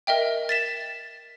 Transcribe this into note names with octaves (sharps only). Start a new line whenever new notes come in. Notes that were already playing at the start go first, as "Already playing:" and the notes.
A#4 D#5 E5 G5
A6 B6 E7